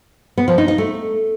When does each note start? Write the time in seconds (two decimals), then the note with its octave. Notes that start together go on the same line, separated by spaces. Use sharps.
0.38 B3
0.48 F3
0.58 D#4
0.68 D#4
0.78 A3